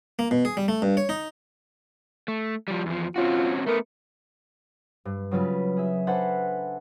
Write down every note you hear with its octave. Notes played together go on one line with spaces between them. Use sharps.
A#3
B2
G#4
G3
A3
G2
C#5
D#4
A3
F3 G3
E2 F3
C4 C#4 F4 F#4
A3 B3 A#4
G2
C#3 F#3 G3 C#4 F4 B4
G#4 E5
D4 A4 B4 C5 F#5 G#5